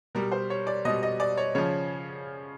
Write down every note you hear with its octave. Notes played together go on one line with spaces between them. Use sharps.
B2 G3 A#4
C5
C#5
D5
B2 G3 D#5
D#5
D5
C#5
C#3 F3 C#5